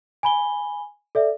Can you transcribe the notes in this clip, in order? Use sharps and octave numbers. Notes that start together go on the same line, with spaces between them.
G#5 B5 G7
A4 D5 E5